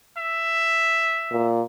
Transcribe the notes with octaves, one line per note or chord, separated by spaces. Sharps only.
E5
A#2